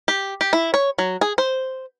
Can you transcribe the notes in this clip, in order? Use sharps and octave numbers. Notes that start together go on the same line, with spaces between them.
G4
G4
E4
C#5
F#3
G#4
C5